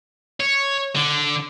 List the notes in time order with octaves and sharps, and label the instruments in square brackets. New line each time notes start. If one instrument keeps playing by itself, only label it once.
[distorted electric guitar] C#5
D3